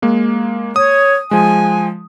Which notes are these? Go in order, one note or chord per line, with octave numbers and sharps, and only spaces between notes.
G#3 A#3
C#5 D#6
F3 G#3 G#5